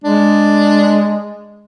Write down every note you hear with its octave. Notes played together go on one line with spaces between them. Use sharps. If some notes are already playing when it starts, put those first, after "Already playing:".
G#3 D4